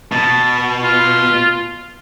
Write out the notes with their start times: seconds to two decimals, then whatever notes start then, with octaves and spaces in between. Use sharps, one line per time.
0.12 B2 A5
0.83 F4